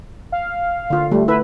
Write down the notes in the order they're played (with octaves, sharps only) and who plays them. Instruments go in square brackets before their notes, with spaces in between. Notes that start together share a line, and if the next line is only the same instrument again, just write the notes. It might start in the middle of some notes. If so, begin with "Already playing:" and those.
[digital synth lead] F5
[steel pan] D3 F4
[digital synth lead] G3 [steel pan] A3
[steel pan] E4 B4 [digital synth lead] E5